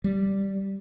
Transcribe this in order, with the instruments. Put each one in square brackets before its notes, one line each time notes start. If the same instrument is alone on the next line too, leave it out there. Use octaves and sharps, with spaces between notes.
[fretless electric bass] G3